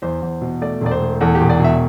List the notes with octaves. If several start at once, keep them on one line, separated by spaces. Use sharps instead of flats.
E2 C5
E2
B2
A3 D5
E1 D5
C5
A3
E2 A4
G4
E1
D5
B2 E5